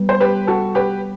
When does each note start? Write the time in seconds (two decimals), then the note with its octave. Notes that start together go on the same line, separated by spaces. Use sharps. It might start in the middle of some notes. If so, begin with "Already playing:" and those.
Already playing: G3 B3
0.09 C5
0.20 G4 B4
0.47 F#4 A4
0.75 G4 B4